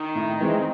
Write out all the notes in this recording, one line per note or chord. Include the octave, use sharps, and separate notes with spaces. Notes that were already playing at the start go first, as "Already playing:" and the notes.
Already playing: D#3
A2
E3 G#3 C4